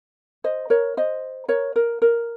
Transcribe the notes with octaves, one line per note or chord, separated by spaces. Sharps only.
C5 D#5
A#4 C#5
C5 D#5
A#4 C#5
A#4
A#4